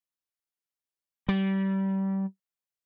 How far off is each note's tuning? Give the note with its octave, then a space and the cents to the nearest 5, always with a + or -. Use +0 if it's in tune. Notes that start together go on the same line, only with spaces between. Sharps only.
G3 -25